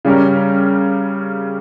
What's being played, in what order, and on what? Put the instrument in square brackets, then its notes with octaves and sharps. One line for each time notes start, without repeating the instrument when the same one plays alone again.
[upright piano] C#3 G3 C#4 G4 A#4